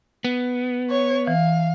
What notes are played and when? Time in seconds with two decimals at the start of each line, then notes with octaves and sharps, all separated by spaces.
0.24 B3
0.90 C#5
1.27 E3 F5